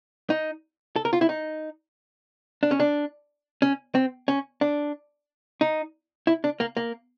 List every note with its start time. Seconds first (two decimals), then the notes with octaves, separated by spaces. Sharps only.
0.30 D#4
0.96 A4
1.05 A#4
1.13 F4
1.21 E4
1.29 D#4
2.63 D4
2.71 C#4
2.80 D4
3.62 C#4
3.95 C4
4.28 C#4
4.61 D4
5.61 D#4
6.27 E4
6.44 D4
6.60 A#3
6.77 A#3